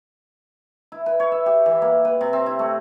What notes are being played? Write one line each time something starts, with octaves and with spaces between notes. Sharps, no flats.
E4
B4
C#5
E5
G4
E3
A#3
B4
C3
C4
E4
A3